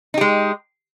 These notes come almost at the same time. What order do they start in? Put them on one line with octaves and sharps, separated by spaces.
D#4 G4 G#3